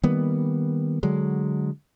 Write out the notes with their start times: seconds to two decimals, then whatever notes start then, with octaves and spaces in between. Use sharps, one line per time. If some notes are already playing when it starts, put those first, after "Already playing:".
0.03 D#3 G3 A#3 B3
1.03 D3 F#3 G#3